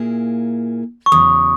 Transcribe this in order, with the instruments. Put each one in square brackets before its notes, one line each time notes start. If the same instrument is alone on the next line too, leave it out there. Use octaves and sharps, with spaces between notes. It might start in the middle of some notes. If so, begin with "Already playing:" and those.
Already playing: [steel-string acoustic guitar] A#2 A#3 E4 G#4
[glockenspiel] C#6
[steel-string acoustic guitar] E2 C#3 F#3 [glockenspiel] D#6